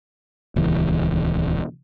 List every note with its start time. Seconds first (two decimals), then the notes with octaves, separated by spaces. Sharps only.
0.56 D#1 C#2 E3